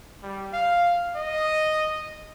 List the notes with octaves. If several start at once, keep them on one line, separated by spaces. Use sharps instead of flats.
G3
F5
D#5